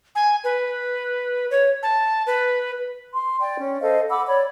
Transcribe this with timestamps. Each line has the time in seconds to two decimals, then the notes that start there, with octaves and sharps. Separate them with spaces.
0.15 G#5
0.44 B4
1.51 C#5
1.83 A5
2.27 B4
3.13 C6
3.40 D5 G5
3.59 C#4
3.80 A4 C5 D#5 F5
4.09 F#5 B5 D6 E6
4.26 C#5 D5 B5